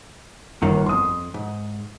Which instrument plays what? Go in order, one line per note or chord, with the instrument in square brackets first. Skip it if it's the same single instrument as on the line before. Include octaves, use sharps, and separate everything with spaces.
[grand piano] G1 [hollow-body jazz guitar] A2 D#3 A#3
[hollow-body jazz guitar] B1 F2 [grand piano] C6 D#6
[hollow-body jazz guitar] G#2